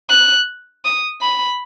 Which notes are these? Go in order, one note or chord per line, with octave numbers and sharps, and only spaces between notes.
F#6
D#6
B5